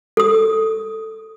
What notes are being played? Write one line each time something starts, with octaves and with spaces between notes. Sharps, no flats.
A4 D#6